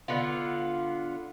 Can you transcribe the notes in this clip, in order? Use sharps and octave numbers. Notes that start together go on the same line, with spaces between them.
D3 B3 F4